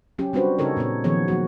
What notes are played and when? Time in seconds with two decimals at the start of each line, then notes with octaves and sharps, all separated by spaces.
0.18 F#3 C#4 G4
0.33 G3 C4 D4 F#4 B4 C5
0.59 C#3 C#4 D#4 A4 A#4 C#5
0.77 A#2 B3 C#4 C#5
1.04 D#3 F3 F#3 B3 G#4 C#5
1.28 F#3 A#3 F#4